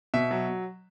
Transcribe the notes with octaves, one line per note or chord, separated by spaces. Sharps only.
B2 E5
F#3